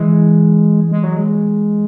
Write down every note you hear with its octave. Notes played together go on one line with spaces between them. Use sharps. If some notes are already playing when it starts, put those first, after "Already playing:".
Already playing: E3 G#3
G#3
F#3
G#3